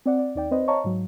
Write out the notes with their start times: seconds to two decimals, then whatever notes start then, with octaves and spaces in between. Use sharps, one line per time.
0.06 C4 D5 F#5
0.19 D5
0.35 D#2 D#4 D5 G5
0.51 C4 B4 C5 D#5
0.68 C#5 D#5 F5 A5 A#5 C#6
0.84 G#2 F#3